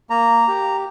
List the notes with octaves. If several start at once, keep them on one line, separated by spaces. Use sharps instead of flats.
A#3 A#5
G4